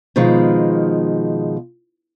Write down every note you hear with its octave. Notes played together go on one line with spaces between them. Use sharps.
B2 D#3 F3 G#3